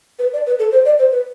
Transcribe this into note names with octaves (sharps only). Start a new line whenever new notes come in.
B4
D5
B4
A4
C5
D5
C5
B4